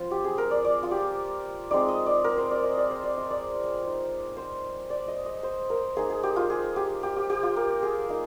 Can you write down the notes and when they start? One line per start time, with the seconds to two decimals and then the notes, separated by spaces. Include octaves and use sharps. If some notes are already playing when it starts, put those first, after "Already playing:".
Already playing: F3 C4 F4 C5
0.11 G4
0.24 G#4
0.38 A#4
0.51 D5
0.65 D5
0.83 F4
0.91 G4
1.71 G#3 C4 D#4 D5
1.88 D#5
2.06 D5
2.24 A#4
2.37 C5
2.51 D5
2.64 D#5
2.77 D5
2.91 C5
3.04 D5
3.17 D#5
3.30 D5
3.84 G#3 D#4
4.37 C5
4.90 D5
5.08 D#5
5.26 D#5
5.43 C5
5.70 A#4
5.96 A#3 D#4 G#4
6.10 G#4
6.23 G4
6.36 F4
6.50 G#4
6.76 G4
7.03 G4
7.16 G4
7.30 G4
7.43 F4
7.56 A#4
7.83 G#4
8.09 A#3 D#4